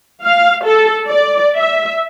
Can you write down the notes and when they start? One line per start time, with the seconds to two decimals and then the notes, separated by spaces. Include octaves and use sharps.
0.24 F5
0.66 A4
1.07 D5
1.57 E5